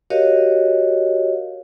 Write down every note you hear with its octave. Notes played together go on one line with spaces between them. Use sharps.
F#4 G4 A#4 C#5 D#5 F5